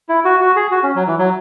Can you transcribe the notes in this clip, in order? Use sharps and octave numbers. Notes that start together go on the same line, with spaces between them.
E4
F#4
F#4
G#4
F#4
C#4
F#3
E3
F#3